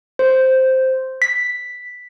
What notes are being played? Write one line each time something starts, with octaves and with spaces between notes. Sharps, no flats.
C5
B6